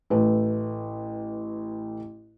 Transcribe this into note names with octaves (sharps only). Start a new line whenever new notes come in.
A1 A3 B4